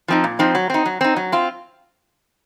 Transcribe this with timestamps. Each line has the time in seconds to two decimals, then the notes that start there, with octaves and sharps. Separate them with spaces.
0.08 F3 C4 D#4
0.24 A#2
0.39 F3 C4 D#4
0.55 F#3
0.70 C4 D#4
0.86 F#3
1.01 C4 D#4
1.16 F#3
1.32 C4 F4